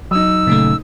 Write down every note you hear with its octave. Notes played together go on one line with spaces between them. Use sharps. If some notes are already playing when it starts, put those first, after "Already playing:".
F#3 D#4 D#6 E6
A#2 C#3 A3